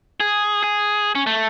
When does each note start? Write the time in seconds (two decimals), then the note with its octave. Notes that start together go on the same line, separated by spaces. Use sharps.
0.20 G#4
0.64 G#4
1.15 C#4
1.27 A3